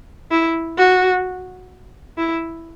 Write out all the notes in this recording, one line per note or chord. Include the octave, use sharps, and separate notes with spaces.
E4
F#4
E4